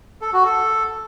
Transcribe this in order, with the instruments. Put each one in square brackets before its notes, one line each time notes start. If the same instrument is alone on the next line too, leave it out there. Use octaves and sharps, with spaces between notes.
[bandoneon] A4
F#4
A4